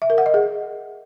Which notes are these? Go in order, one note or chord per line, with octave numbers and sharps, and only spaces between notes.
E5
A#4
F#5
D#5
G#4